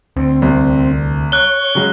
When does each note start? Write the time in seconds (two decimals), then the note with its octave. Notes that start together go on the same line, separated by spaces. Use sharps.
0.17 D2 C4
0.42 C2
1.32 C#5 F#6 G7
1.75 C#3 F#3 G#3